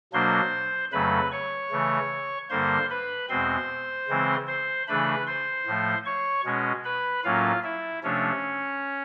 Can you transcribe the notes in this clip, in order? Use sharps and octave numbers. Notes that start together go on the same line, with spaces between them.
B2 F#3 A#3 D4 C5 C6
F2 C#3 F#3 A3 B4 B5
C#5 C#6
C#3 E3 A3
G2 D3 G3 A#3 C5 C6
B4 B5
E2 B2 G#3 C4 C5 C6
C#3 E3 G#3 C4
C5 C6
C#3 E3 A3 D4 B4 B5
C5 C6
A2 F3 A3
C#5 C#6
B2 G#3 C#4
B4 B5
A2 F#3 A#3 C#4 F4 F5
E4 E5
C3 F3 A3 C#4 D4 C#5